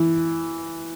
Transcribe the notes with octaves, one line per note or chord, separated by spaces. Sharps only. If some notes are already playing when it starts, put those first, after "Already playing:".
Already playing: E3